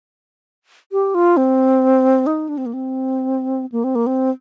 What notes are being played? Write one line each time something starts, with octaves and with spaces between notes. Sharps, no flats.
G4
F4
C4
D#4
D4
C4
A#3
C4
A#3
C4
A#3
C4